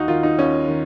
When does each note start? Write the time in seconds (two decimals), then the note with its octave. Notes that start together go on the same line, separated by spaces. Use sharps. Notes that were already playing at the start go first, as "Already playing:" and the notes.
Already playing: D#2 D#4 F#4
0.08 D#3 F4
0.23 D#4
0.38 D#2 C#4
0.68 D#3